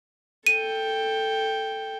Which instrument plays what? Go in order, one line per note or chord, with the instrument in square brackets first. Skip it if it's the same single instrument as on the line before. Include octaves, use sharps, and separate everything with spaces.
[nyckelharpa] A4 G5 [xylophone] D#7